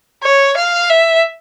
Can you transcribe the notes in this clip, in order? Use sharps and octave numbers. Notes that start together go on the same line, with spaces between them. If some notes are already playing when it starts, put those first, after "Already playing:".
C#5
F5
E5